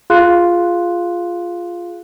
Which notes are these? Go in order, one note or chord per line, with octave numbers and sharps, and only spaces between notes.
F4 G#4 F5 C6 F#6